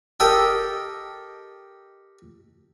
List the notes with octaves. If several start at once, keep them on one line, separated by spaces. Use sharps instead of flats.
G4 A4 A#4 D#5 G5